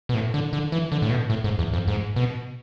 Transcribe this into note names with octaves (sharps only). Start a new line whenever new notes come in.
B2
A2
D3
D3
E3
D3
A2
B2
A2
G#2
E2
F2
G#2
B2